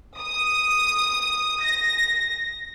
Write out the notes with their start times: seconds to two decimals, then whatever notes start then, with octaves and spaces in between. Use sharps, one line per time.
0.19 D#6
1.62 A#6